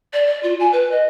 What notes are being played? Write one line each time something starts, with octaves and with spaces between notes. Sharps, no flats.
D5
D5
F4
G#5
B4
D#5